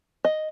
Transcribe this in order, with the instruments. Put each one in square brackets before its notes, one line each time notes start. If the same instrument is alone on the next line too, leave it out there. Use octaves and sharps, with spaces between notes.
[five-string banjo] D#5